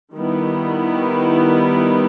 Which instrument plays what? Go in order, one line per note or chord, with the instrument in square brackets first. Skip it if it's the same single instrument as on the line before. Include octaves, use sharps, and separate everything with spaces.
[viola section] D#3 G3 B3 E4